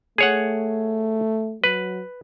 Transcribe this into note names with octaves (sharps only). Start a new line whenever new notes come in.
A3 G#4 C#5 F#5
F#3 B4